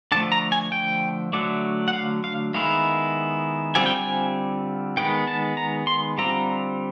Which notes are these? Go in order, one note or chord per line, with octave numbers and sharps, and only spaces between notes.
D3 F3 A3 A5
A#5
G#5
G5
D3 F#3 A3 D4
F#5
F5
F5
D#3 G#3 B3 E4 F5
D3 G3 C4 F4 G#5
G5
G#5
D#3 G#3 B3 G5
A5
A#5
C6
D3 G3 C4 F4 A#5